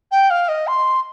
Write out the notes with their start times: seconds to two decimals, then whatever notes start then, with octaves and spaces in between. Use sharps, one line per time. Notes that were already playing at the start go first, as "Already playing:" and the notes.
0.11 G5
0.30 F5
0.48 D#5
0.67 C6